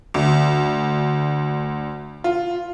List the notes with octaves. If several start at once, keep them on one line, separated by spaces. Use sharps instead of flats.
D2
F4